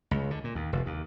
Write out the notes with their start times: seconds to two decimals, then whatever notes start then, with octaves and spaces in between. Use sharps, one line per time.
0.11 C#2
0.31 D3
0.44 A#2
0.55 D#2
0.73 F1
0.86 D#2